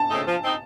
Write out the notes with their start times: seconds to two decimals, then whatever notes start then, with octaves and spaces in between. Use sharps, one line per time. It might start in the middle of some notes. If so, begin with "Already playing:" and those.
Already playing: A5
0.09 C#3 A3 C4 D#4
0.25 F3
0.42 C4 D#4